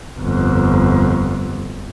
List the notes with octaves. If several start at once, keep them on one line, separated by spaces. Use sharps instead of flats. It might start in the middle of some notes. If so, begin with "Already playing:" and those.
G1 F2